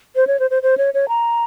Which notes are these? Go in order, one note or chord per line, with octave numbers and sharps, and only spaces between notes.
C5
C#5
C5
C5
C5
C#5
C#5
A#5